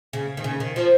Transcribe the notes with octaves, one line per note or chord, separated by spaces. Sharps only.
C#3
D#3
C#3
D#3
F3